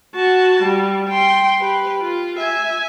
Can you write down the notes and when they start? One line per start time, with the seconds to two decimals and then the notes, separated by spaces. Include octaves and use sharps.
0.16 F#4 A5
0.62 G3
1.09 G5 C6
1.60 G4 B4
2.01 F4
2.39 E5 G#5